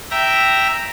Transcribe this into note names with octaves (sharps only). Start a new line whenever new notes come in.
E5 G5 A#5